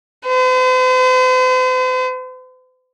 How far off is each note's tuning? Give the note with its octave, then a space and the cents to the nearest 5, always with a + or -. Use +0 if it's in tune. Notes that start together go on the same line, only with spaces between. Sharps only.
C5 -45